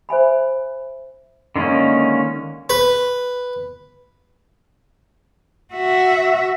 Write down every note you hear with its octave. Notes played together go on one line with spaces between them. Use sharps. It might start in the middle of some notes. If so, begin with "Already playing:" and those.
C5 E5 G#5 B5
D3 D#3 G#3 A#3 C#4
B4
F#4 E5